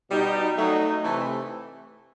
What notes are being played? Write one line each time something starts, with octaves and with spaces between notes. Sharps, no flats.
B2 G3 D#4
F#3 A3 D#4
C3 E3 A3